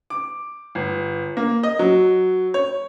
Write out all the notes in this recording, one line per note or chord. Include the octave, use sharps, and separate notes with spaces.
D6
G1
A#3
D#5
F#3
C#5